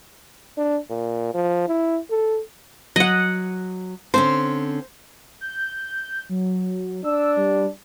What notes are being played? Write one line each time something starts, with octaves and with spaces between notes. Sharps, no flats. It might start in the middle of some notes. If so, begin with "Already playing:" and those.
D4
A#2
F3
E4
A4
F#3 D#5 F#5
D3 C4 C#4 C5
G6
F#3
D4 E6
G3